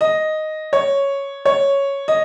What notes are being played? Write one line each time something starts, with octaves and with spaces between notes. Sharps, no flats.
D#5
C#5
C#5
D#5